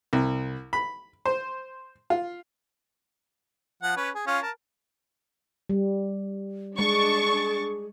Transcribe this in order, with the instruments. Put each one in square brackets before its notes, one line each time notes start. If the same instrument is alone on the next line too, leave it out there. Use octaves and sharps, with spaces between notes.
[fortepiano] C2
B5
C5
F4
[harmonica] F3 F#5
C#4 B4
G#4
C#4 F4 F5
A#4 A5
[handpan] G3
[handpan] G#3 [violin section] D4 C#6 A6 [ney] G#4